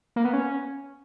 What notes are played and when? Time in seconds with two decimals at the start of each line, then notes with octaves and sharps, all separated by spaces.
0.16 A#3
0.25 B3
0.33 C#4